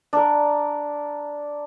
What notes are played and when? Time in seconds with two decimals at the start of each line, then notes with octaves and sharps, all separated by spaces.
0.13 D4 A#4